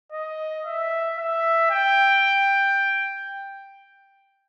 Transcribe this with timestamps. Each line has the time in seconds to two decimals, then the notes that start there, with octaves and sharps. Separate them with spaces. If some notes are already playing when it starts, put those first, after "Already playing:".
0.12 D#5
0.65 E5
1.18 E5
1.71 G5